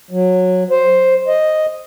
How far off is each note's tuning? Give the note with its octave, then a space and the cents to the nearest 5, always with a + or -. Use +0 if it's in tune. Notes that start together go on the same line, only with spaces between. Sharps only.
F#3 -15
C5 +5
D#5 +0